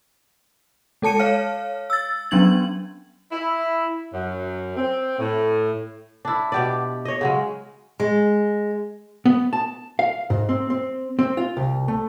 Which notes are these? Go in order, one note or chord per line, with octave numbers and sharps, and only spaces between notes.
G#3 A4 A5 C#7 D#7
C#5 F5 F6
E6 A6
F#3 B3 C#4 D4 G#6 F#7
E4
F#2
C4
A2
D4 E4
B2 G4 D5
C#5 D#5
C#3 F#3 G#3
G#3
B3
A5
F5
G#2
C4
C4
C4
F4
C2
A3